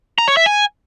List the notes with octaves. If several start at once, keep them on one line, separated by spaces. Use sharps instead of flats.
A#5
C#5
E5
G#5